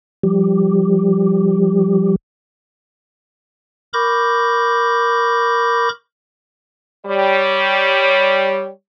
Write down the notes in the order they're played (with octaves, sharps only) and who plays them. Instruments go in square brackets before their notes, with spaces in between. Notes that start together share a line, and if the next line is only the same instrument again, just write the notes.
[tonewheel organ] F3 G3 G4
[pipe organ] A#4 B5 C#6 D6 G6 A#6
[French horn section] G3 C#5